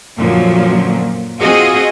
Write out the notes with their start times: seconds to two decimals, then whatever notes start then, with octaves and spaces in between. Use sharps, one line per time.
0.17 F#2 A#2 D3 F3 F#3
1.40 C4 F4 F#4 G#4 D#5